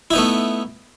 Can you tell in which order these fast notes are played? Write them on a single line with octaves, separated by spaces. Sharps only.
E4 D#4 B3 A3